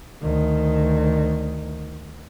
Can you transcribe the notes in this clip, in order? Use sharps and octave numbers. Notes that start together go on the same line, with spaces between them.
D2 D#3